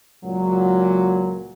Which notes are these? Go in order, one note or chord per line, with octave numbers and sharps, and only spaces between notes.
C#2 A#2 F#3